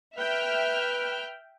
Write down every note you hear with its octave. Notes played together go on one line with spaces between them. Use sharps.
B4 E5 G5 F6